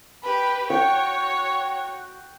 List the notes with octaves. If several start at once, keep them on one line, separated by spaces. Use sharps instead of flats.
G4 B4 B5
F#4 C#5 G5